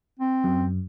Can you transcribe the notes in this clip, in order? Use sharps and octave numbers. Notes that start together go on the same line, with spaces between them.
C4
F#2